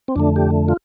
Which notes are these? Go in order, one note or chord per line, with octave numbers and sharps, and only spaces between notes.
C4
F2 D3 A3 D4
G4
F4